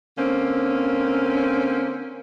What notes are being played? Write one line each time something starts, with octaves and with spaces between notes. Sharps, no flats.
D3 A#3 C4 C#4